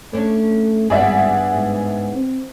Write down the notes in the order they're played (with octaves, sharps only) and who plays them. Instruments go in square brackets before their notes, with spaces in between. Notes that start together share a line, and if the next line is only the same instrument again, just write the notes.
[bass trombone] A3 [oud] C#4 D4
[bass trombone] G#1 [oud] G2 B3 [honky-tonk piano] G#4 D5 E5
[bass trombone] G#2
C4